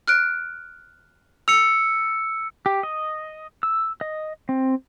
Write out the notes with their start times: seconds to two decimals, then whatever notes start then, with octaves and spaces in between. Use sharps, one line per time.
0.08 F6 F#6 D7
1.48 E6 C#7 F7
2.66 G4
2.83 D#5
3.63 E6
4.01 D#5
4.49 C4